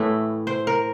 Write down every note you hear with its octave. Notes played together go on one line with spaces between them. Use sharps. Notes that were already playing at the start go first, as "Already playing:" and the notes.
Already playing: A2 E3 A3 E4
C5
A#4